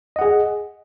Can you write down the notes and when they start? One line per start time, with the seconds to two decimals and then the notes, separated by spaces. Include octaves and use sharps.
0.16 D#5
0.19 F#5
0.21 G#4